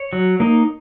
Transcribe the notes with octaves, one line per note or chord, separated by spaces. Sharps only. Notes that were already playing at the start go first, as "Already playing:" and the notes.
Already playing: C#5
F#3
A#3 D#4